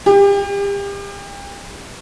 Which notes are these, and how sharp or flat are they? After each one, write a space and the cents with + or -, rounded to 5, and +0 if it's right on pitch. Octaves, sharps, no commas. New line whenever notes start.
G4 +35